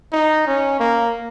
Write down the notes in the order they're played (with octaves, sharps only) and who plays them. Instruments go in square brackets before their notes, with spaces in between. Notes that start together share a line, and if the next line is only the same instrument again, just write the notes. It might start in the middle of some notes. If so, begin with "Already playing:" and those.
[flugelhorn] D#4
C#4
A#3